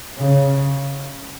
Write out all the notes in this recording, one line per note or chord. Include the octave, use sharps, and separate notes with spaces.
C#3